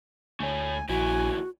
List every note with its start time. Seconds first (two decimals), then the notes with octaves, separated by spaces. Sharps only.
0.40 D2 A3 C#5 G#5
0.89 A#1 D#2 E4 F#4 G#5